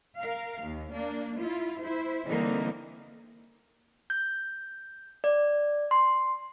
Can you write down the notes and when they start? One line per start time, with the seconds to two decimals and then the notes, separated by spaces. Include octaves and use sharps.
0.18 A#4 F5
0.63 D#2
0.92 A#3 D4
1.37 E4 F4
1.82 E4 C5
2.26 D3 E3 G3 A#3 C4 D#4
4.10 G6
5.24 D5
5.91 C6